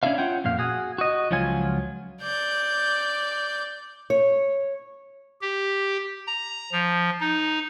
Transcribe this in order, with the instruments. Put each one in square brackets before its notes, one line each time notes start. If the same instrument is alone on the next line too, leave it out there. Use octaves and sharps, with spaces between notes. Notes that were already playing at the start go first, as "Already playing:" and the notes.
[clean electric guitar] C#4 D4 E4 F4 E5 F5
C#4 F4 E5 F#5 G5
F2 A#2 F5
F#4 G#4
F#4 D#5
C#2 F3 F#3 F4 G#5
[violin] D5 G6
[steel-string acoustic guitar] C#5
[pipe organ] G4
A#5
F3
D#4